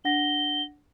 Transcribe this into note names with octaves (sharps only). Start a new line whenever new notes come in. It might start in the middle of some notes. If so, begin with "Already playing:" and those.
D4 F#5 A#6 G7